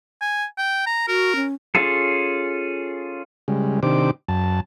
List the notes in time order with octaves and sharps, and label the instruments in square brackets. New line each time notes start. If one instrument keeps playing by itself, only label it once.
[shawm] G#5
G5
A#5
[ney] F#4 [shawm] A#4
[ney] C#4
[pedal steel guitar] C#4 F4 G#4 A4
[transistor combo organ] C#3 G3 G#3
C3 D#3 D4 G4 C5 D6
F#2 A5